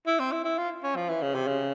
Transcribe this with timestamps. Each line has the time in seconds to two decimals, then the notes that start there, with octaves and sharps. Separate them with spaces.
0.07 E4
0.20 C4
0.32 E4
0.45 E4
0.58 F4
0.83 C#4
0.96 F3
1.09 E3
1.22 C#3
1.34 C3
1.47 C#3